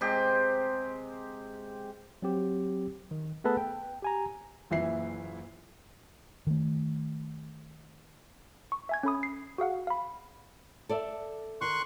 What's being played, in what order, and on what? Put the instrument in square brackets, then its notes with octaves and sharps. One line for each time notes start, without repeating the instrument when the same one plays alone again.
[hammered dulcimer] C3 G#3 G4
[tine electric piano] F#3 C4 G4
D#3
A3 B3 G#4 A4 B4 A5
G5
G4 G#5 A#5
[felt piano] F#1 A#2 E3 E4 E5 C7
[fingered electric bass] D#3 A3
[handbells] C#6
E5 G#5 G#6
C#4 A4 B5 D#6
C7
F#4 G#4 F5 F#5
F5 B5
[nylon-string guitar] A4 D5 E5
[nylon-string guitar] D#3 [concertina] C6 C#6 F#6